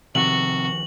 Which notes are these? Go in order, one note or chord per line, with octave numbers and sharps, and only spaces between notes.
C3 D#3 F3 F#4 F#7